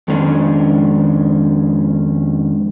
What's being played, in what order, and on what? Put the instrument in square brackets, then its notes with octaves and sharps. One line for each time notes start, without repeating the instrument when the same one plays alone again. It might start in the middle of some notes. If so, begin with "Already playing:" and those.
[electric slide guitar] F2 D#3 G#3 C#4 D4